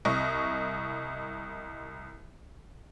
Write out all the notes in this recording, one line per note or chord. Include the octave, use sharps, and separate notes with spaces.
C2 D#5 C#6